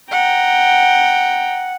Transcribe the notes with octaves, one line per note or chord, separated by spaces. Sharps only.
F#5 G5 A#5